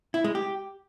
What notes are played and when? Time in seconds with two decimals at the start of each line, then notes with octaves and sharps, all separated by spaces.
0.14 E4
0.24 G#3
0.35 G4